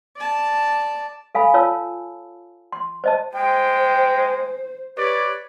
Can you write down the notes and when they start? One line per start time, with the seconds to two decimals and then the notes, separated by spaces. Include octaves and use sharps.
0.16 D5 A5
1.35 A4 F5 G#5 B5
1.54 F4 C#5 A5 E6
2.72 C6
3.04 C5 D#5 A5
3.35 G#3 C5 G5
4.98 G4 B4 C#5 D5